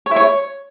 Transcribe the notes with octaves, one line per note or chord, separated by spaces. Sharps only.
C#5
E4
C#5